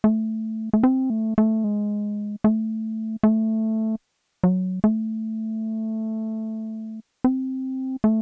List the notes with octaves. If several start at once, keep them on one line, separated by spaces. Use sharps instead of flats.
A3
A3
C4
A3
A3
G#3
A3
A3
F#3
A3
C4
A3